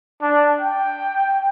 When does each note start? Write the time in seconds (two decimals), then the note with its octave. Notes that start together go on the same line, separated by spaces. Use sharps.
0.22 D4
0.61 G5